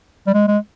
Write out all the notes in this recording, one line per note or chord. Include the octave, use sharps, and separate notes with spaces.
G3
G#3
G#3